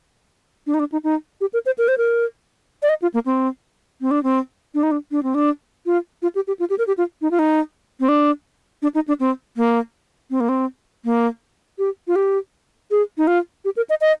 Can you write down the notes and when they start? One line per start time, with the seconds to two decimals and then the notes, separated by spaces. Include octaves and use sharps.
0.67 D4
0.74 D#4
0.79 D4
0.92 D#4
1.04 D#4
1.41 G4
1.53 A#4
1.66 C5
1.78 A#4
1.88 C5
1.98 A#4
2.82 D5
2.89 D#5
3.02 F4
3.14 A#3
3.26 C4
4.01 C4
4.11 D4
4.23 C4
4.74 D4
4.83 D#4
4.91 D4
5.11 D4
5.23 C4
5.35 D4
5.86 F4
6.22 F4
6.35 G4
6.47 G4
6.59 F4
6.70 G4
6.78 A#4
6.87 G4
6.98 F4
7.22 D#4
7.31 F4
7.39 D#4
8.00 C4
8.09 D4
8.82 D4
8.95 D#4
9.08 D4
9.20 C4
9.57 A#3
10.30 C4
10.40 A#3
10.49 C4
11.05 A#3
11.78 G4
12.08 F4
12.16 G4
12.91 G#4
13.18 D#4
13.27 F4
13.65 G4
13.77 A#4
13.90 D#5
14.01 D#5